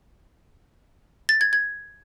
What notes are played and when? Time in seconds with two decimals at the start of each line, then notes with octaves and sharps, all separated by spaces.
1.29 A6
1.41 G#6
1.53 G#6